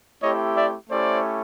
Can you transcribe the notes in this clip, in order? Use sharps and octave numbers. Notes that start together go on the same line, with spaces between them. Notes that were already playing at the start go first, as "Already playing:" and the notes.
A3 C4 E4 G4 C#5 D#5
D5 E5
A3 C#4 E4 G4 C5 D5